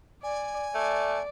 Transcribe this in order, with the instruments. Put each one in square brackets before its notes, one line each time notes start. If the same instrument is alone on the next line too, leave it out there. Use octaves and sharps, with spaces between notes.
[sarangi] D5 [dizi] G#5
[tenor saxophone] A3 [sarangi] D5